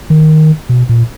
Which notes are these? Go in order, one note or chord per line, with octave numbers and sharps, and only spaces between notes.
D#3
B2
A#2